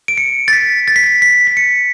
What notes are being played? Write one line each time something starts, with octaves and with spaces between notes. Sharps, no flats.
D7
C#7
A6
B6
A6
B6
A6
B6
B6
C#7